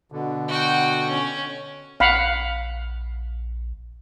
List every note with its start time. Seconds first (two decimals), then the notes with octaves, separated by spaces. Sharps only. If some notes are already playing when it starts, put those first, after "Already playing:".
0.12 B2 D3
0.48 F#4 G5
1.09 C#4
2.00 A#1 F5 F#5 B5